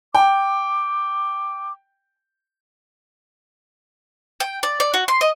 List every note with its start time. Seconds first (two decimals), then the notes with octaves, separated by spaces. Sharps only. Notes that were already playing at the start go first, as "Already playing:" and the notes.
0.15 G5 D6
4.40 G5
4.63 D5
4.80 D5
4.94 F#4
5.08 C6
5.21 D#5